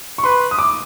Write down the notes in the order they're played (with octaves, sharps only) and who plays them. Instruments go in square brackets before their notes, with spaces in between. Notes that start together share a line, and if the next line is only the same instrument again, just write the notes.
[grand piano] C#6
[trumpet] B4 [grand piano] C6
[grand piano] D#6
D6